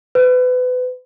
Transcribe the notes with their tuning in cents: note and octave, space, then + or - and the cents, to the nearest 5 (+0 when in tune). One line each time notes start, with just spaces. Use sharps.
B4 +30